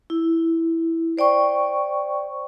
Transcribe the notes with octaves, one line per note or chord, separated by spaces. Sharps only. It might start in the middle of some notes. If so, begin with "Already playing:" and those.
E4
C5 D5 G5 C#6